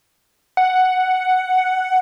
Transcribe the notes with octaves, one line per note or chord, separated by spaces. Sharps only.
F#5